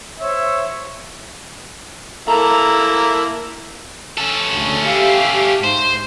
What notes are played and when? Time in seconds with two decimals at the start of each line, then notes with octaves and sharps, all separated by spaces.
0.21 C5 C#5 E5
2.28 A#3 E4 A4 A#5
4.18 C#4 A4
4.52 D2 C#3
4.85 G4 E5 F5
5.64 G#2 C5